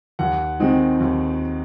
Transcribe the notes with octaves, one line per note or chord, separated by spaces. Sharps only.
D#2 F#5
D#3 G#3 C4 D#4
D#2